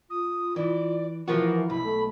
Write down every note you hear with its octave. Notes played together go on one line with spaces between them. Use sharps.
F4 D#6
E3 D5
E3 F3 F4 F#4 A#4
B1 E4 B5
A3